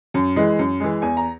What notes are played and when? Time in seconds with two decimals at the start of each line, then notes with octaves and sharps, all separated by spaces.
0.14 F#2
0.36 E3 G#3
0.59 F#2
0.80 E3 G#3
1.02 E2 G#5
1.17 A#5